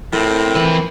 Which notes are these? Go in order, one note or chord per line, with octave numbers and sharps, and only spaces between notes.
A2 F3 C4 A#4
E3 B4